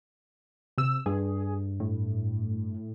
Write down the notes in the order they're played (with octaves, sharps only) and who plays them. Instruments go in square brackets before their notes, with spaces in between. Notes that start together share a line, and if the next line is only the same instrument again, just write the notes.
[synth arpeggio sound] C3 E6
[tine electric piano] G2 [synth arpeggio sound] G#4
[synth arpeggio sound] A2